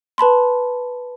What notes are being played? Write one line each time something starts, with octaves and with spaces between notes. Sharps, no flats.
B4 A5 B5 C6